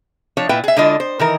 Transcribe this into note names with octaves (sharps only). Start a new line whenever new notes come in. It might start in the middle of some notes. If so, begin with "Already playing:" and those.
F3 D4 C#5
A#2 E4 B4 E5 G5
G#4 E5
D3 G#3 D4 E4 F4 D#5
C5
D#3 E3 A#4